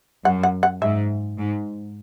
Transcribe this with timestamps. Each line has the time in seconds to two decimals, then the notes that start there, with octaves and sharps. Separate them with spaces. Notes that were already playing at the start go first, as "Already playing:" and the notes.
0.25 F#2 F#5
0.43 F#5
0.63 F#5
0.81 G#2 E5
1.38 G#2